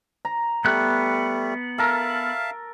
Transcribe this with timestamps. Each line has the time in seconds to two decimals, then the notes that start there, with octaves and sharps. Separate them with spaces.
0.25 A#5
0.65 G3 A3 B3 F#6
1.78 A4 A#4 E5 F5 A5